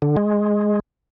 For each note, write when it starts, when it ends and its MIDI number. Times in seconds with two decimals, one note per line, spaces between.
0.02 0.16 50
0.17 0.80 56